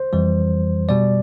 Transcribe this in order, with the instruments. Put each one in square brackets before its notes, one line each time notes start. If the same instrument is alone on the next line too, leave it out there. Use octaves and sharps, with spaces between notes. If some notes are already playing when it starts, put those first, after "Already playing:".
Already playing: [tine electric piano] C5
F2 E3 G3
B2 G3 D5